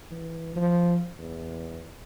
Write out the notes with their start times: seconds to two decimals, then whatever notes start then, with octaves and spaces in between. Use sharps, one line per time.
0.11 E3
0.56 F3
1.18 E2